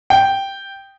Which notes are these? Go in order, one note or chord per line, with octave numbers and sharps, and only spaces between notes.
G5